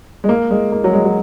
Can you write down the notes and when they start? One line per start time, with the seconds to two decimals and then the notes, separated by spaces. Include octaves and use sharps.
0.24 G#3
0.29 A#3
0.51 G#3
0.72 A#3
0.84 F#3
0.93 G#3
1.05 F#3